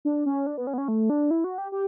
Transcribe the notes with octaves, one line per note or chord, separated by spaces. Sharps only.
D4
C#4
D4
B3
C#4
B3
C#4
A3
D4
E4
F#4
G4
G4